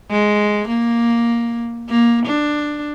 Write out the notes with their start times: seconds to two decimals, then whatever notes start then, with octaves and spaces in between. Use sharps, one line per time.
0.11 G#3
0.68 A#3
1.89 A#3
2.26 D4